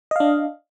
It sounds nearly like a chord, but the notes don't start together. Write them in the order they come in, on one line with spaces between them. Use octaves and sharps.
D#5 F5 D4